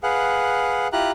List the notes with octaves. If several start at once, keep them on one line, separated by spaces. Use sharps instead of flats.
G#4 B4 F5 F#5
E4 F4 G4 A#5 F#6